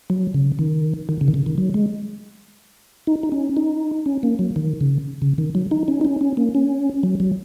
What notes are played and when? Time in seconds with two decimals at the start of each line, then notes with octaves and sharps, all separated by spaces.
0.10 F#3
0.34 C#3
0.59 D#3
1.09 D#3
1.21 C#3
1.28 D#3
1.34 C#3
1.46 D#3
1.58 F#3
1.74 G#3
3.07 D#4
3.23 D#4
3.32 C#4
3.57 D#4
4.06 C#4
4.23 A#3
4.39 F#3
4.56 D#3
4.81 C#3
5.22 C#3
5.38 D#3
5.55 F#3
5.71 D#4
5.88 C#4
6.01 D#4
6.05 C#4
6.21 C#4
6.37 A#3
6.55 C#4
7.03 F#3
7.20 F#3